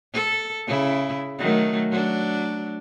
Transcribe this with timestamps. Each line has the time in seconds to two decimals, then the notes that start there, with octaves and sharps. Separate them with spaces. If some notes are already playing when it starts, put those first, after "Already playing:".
0.13 A4
0.67 C#3 E4
1.38 D#3 F#3 A3
1.90 F#3 D4